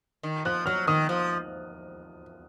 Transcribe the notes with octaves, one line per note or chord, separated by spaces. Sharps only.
D#3
F3 F#6
F#3 F6
D#3 D#6
F3